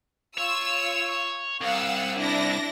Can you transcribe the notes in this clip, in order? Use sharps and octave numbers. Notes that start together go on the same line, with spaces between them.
F4 C#5 E6
C2 F5 F#5 E6
D4 E4 A#6